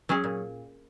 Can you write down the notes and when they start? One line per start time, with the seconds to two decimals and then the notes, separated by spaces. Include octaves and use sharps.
0.09 F#3 C#4 G#4
0.24 A#2